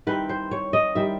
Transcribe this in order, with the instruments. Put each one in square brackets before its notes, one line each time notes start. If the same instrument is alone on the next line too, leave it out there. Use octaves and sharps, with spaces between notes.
[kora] D#3 G3 C4 E4 B4
C5
C#5
D#5
D#3 G3 C4 E4 E5